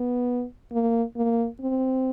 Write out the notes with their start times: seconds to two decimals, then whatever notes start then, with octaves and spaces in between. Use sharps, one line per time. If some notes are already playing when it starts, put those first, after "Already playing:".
Already playing: B3
0.72 A#3
1.16 A#3
1.60 C4